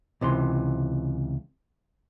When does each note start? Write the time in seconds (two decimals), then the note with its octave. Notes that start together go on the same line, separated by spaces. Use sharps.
0.21 C#2 C3 E3 C6